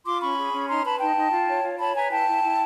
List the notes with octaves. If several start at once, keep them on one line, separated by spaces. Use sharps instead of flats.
F4 C6 D6
C#4 B5 C#6
G#4
C#4
D#4 A#5 C6
B4 A5 B5
D#4 G5 A5
D#4
F4
C#5
F4
C#5 A5 B5
B4 G#5 A#5
E4 G5 A5
E4
E4